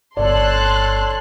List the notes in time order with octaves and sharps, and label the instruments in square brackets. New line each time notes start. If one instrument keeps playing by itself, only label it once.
[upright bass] G1 D3 [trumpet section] A4 C#5 A5 [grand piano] D5 [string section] C6 F#6